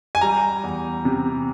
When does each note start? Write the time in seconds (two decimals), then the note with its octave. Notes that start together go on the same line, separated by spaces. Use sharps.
0.15 G#5
0.21 G3 A#5
0.63 E2
1.05 C3